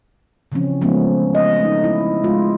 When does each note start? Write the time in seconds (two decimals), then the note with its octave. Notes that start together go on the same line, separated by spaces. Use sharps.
0.52 C#3 E3 F3 C4 C#4
0.81 F3 G#3 A3 B3 C#4
1.35 D#5
1.60 A3 D#4
1.84 E4
2.24 G#3 F4